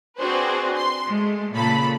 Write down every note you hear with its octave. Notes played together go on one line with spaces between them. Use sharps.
C4 D4 F#4 G#4 B4 C5
C6
G#3 A3
A#2 C#3 A4 B5